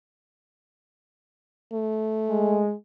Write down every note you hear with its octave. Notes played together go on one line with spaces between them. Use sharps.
A3
G#3